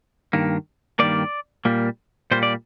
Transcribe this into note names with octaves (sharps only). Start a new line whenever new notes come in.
G2 D#3 A#3
G2 D#3 G3 A#3 D5
A#2 G3 A#3
A#2 G3 A#3 C5
D5